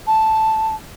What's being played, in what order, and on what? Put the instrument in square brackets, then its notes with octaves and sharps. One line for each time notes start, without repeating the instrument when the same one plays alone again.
[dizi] A5